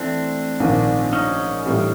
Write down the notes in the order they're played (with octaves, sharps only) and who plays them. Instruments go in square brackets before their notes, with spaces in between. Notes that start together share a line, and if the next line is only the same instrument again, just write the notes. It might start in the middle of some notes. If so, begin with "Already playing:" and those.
Already playing: [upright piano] E3 A3 [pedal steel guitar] C4 D4
[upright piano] A#1 G#2 D#3
[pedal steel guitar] C#4 D#4
[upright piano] A2 E3 G3